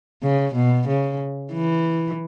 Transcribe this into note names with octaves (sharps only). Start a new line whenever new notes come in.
C#3
B2
C#3
E3